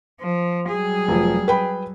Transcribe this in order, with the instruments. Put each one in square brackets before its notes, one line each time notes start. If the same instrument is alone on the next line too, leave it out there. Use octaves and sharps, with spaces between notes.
[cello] F3
[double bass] F#3 G3 [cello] G#4
[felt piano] F1 F3
B4 G5 B5